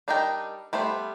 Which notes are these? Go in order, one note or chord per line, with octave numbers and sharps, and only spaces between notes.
G3 D4 D#4 A#4 G5
G3 A3 B3 C5